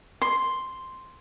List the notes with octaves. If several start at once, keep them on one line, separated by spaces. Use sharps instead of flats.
C6